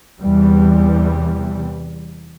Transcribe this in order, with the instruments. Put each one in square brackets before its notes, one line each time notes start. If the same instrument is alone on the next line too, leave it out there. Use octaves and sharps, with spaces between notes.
[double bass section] E2 C3 E3 G3